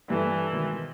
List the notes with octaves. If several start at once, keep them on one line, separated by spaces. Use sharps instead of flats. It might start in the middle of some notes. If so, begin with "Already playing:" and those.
G2 E3 A4
G#2 B2 D#3